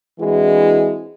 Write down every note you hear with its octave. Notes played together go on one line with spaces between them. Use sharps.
E3 G#3 C4 D4 E4 F#4